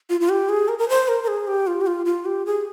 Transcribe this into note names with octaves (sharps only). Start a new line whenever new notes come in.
F4
F4
G4
G#4
A#4
A#4
C5
A#4
A#4
G#4
G4
F4
G4
F4
F4
G4
G#4